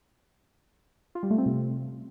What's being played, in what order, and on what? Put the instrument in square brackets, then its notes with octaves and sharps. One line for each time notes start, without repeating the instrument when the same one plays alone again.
[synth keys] F4
G3
A3
C4
C3